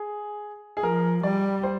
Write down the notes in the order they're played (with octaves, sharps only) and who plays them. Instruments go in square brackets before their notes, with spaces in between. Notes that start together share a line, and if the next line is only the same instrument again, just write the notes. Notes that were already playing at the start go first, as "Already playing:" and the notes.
Already playing: [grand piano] G#4
G#4
[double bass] F3 [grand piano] A#4
[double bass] G3 [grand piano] D5
[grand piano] C5